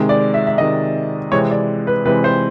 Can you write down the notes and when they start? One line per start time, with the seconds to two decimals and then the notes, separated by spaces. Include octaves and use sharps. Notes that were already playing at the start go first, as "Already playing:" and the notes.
Already playing: C3 D#3 G#3
0.09 D5
0.34 E5
0.47 E5
0.58 C3 D#3 G#3 D#5
1.32 C3 E3 G#3 C4 C#5
1.51 D5
1.87 B4
2.05 C3 E3 G#3 C4 B4
2.24 C5